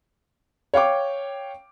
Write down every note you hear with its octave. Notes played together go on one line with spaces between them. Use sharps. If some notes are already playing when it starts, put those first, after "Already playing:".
C#5 F5 G5 D6